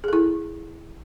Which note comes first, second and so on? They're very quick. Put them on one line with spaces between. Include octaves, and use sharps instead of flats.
G#4 A4 E4